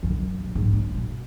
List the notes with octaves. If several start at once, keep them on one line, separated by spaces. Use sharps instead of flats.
E1 F#2
C3
G#2
G3 B3
B2